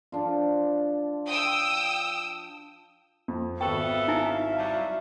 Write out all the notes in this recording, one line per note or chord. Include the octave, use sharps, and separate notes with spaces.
F3 D4 F4
G5 D#6 E6
F2
G#1 B3 A4 E5 F5 G5 C#6
D#4 E4 G#5
F#3 G3 A5